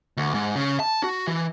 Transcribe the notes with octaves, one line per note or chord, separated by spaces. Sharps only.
D2
G#2
C#3
A5
F#4
E3